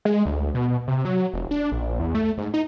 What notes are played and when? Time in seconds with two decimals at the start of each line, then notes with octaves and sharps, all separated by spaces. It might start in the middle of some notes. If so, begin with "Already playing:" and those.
0.05 G#3
0.25 D2
0.54 B2
0.88 C3
1.05 F#3
1.33 F1
1.51 D4
1.72 A#1
1.99 E2
2.15 A3
2.38 G#2
2.54 D#4